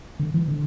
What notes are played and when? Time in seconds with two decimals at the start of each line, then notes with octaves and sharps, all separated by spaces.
0.19 D3
0.34 E3
0.48 D3